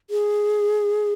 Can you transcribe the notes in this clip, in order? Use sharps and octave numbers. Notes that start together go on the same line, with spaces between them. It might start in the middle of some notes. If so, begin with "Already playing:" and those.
G#4